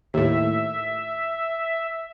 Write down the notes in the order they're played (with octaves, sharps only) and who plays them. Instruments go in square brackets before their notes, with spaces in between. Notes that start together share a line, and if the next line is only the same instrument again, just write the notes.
[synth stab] D#2 A2 [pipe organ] E5